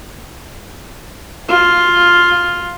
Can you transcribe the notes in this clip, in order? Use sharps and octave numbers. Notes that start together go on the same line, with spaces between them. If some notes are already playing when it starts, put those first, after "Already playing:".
F4